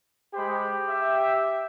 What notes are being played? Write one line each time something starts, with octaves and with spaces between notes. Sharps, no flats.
G#3 G4 C5 B5
E5